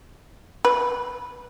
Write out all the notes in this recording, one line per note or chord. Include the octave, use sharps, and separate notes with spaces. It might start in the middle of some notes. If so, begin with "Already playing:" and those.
B4